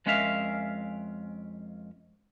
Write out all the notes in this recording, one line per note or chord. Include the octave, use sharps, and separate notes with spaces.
F2 G#3 C#4 A#4 E5 F5